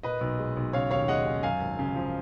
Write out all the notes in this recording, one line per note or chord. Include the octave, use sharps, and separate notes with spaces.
A#2 B4 D#5
B1
G#3
B1
C#3 C#5 F5
D#2 C#5 F5
G#3 D#5 F#5
C#4
F#2 F5 G#5
G#1
C#3
F3